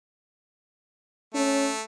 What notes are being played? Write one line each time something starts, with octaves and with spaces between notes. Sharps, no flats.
A3 C#4